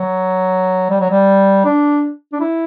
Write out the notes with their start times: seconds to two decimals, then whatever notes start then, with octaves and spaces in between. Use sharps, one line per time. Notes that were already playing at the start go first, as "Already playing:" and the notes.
Already playing: F#3
0.90 G3
1.00 F#3
1.10 G3
1.65 D4
2.33 D4
2.40 E4